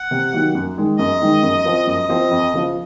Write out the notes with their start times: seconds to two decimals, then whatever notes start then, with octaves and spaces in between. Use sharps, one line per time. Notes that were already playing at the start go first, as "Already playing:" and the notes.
Already playing: F#5
0.11 C3
0.33 D#3 F#3 A#3
0.55 F#2
0.77 D#3 G#3
0.98 F#2 D#5
1.21 D#3 G#3
1.43 F#2
1.65 F3 C4
1.87 F#2 D#5
2.09 F3 C4
2.31 F2
2.53 C#3 F3